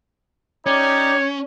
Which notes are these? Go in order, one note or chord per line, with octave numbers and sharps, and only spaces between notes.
C#4 D#4 G4 C#5 D5